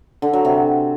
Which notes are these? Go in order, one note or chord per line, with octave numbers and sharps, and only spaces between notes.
D3
F#3
C3